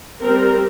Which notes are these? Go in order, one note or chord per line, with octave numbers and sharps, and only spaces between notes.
G3 C4 A#4